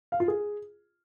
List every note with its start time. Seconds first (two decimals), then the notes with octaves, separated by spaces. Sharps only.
0.12 F5
0.20 F4
0.28 G#4